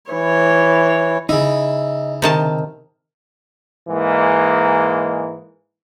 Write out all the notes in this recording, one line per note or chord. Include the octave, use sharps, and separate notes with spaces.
E3 C#5
C#3 D#4 E4
C3 D#3 A5
G#2 E3 G#3 A#3